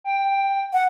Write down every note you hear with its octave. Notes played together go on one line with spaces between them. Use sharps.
G5
F#5